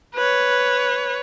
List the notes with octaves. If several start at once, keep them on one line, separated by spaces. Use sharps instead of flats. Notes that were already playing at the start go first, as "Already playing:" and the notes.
B4 C#5